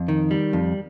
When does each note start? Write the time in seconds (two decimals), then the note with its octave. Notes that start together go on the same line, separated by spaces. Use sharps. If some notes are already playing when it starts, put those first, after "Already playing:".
Already playing: F2
0.08 D#3
0.31 G3
0.53 F2